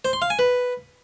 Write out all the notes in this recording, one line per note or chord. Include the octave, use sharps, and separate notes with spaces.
C5
C6
F5
G#5
B4